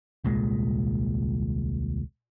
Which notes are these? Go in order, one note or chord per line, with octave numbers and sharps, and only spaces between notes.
D#1 C2 A#2 G#3